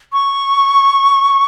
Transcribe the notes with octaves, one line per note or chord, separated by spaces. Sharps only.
C#6